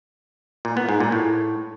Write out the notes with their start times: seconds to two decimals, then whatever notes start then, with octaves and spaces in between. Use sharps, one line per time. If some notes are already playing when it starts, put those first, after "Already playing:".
0.65 A#2
0.77 B3
0.89 G#2
1.00 A#2
1.12 A2